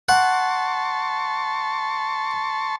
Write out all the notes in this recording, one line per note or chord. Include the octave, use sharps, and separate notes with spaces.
F#5 A5 C6 C#6